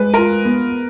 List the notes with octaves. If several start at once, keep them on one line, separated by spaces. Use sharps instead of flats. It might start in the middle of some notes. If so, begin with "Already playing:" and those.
Already playing: G#3 B4
F4 A#4
B3